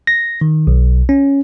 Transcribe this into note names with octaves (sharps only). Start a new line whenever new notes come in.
A#6
D#3
B1
C#4